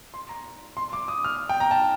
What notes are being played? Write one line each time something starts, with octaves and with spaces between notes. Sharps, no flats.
C6
A#5
C6
D6
D#6
F6
G5
A#5
A5